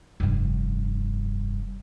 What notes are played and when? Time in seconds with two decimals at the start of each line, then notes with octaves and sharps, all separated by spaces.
0.20 F1 G2